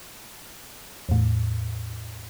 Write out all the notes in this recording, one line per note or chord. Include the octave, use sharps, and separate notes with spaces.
E2 A2